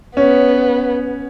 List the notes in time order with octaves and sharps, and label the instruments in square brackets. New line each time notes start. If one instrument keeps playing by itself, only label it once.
[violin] B3 [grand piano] C#4